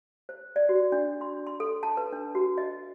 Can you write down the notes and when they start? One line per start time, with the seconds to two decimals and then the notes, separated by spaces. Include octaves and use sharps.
0.29 C5
0.56 D5
0.69 F#4
0.92 D4
1.21 C6
1.47 C6
1.60 A4
1.83 A5
1.97 B4
2.12 D4
2.35 F#4
2.58 D#5